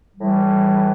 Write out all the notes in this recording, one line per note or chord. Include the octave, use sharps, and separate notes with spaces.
A2 E3 G3